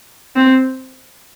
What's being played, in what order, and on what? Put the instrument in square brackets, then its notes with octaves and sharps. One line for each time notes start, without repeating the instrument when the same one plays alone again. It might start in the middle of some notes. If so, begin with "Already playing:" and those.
[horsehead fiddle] C4